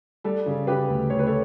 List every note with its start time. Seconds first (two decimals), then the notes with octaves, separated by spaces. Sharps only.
0.24 G3 A4
0.46 C#3
0.67 C#3 G4 B4
0.88 D2
1.10 D2 C#5
1.19 B4
1.26 A4 C#5